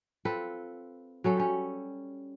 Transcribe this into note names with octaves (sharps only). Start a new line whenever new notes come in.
C4 F4 A4 B4
F#3 C#4 A4
G3 C#4